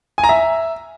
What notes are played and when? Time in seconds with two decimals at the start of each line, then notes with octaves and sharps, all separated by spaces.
0.18 G#5
0.24 A#5
0.29 E5